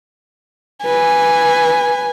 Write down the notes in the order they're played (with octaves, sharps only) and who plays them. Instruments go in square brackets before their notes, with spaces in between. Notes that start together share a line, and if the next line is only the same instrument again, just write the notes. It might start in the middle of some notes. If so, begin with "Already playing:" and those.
[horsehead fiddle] B4 [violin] G#5